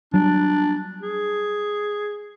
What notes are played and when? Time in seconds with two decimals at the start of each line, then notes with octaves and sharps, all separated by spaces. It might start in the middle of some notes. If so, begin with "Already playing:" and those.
0.14 F#3 G3 D4
1.01 G#4